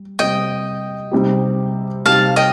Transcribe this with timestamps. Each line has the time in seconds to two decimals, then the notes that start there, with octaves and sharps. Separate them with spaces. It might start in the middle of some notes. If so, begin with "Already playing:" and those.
Already playing: G3
0.19 C3 G3 C4 G4 D#5 G5
1.12 C3 G3 C4 D#4 G4
2.05 C3 G3 C4 D#4 G4 F5 A5
2.36 D#5 G5